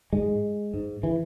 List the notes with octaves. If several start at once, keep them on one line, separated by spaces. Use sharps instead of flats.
G#2 G#3
G#2
E3